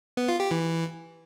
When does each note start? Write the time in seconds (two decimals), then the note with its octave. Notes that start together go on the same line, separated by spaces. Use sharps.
0.17 B3
0.28 F4
0.40 G4
0.51 E3